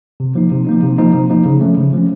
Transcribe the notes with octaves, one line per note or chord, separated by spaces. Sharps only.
C3
F3 A#3 D#4
C3
F3 A#3 D#4
C3
F3 A#3 D#4
C3
F3 A#3 D#4
C#3
F3 A3 C#4
C#3
F3 A3 C#4